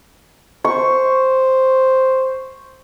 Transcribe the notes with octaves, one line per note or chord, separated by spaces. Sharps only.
C5 C#6